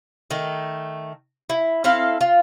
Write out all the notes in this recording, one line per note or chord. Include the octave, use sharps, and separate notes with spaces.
D#3 A3
E4
C4 E4 A4 F5
F4